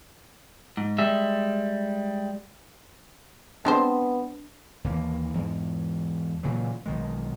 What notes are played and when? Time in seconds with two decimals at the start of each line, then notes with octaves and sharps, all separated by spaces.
0.77 G#2
0.98 G3 G#3 E5
3.65 G#3 B3 C4 D4 C5 A5
4.84 D#2 E3 A#3
5.34 E2 G#2
6.43 A#2 C#3 E3 F#3
6.86 B1 D#3 G#3